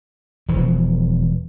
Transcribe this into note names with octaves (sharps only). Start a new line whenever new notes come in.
E1 E3 F3